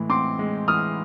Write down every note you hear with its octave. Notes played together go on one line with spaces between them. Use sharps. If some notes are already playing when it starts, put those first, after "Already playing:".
Already playing: A2 E3 G#3
C4 C6 D6
G#3
E3 D#6 F6